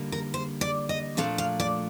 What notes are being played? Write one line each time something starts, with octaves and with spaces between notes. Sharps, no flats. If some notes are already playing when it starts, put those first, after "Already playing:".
Already playing: D3 G3 A#3 D#4
A#4
C5
D5
D#5
A#2 F3 A3 D4 F5
F5
D5